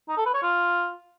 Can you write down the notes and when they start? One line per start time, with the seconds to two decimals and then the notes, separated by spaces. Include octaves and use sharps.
0.09 D#4
0.17 A4
0.26 B4
0.34 C#5
0.42 F4